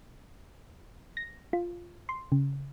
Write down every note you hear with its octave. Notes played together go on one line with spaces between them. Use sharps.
A#6
F4
C6
C#3